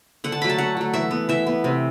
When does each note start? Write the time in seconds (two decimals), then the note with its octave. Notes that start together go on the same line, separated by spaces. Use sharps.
0.24 D3 F#5
0.32 A5
0.41 F#3 A3 B5
0.49 A5
0.58 D3 F#5
0.77 F#3 A3
0.93 E3 E5
1.11 B3
1.29 E3 E5
1.47 B3
1.64 C3